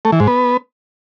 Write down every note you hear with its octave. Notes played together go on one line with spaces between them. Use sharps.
A3
E3
G#2
B3